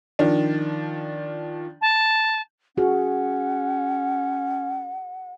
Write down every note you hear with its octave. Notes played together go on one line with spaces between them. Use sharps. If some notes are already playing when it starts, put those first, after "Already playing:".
D#3 F3 D4
A5
C#4 F#4 G#4 F#5